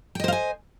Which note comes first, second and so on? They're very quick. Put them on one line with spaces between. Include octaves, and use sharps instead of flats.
G5 D#5 C5 F5 G#5